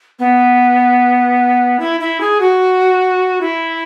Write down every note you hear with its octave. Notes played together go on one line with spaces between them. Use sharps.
B3
E4
E4
G#4
F#4
E4